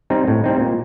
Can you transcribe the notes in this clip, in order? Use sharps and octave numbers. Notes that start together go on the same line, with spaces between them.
G3 C4 D#4
A2
G3 C4 D#4
A#2